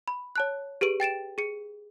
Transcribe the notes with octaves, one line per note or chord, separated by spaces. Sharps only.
B5
C#5 A5 F#6
G4 G#4 B4 D7
G5 A6 D7 E7
G#4 C#7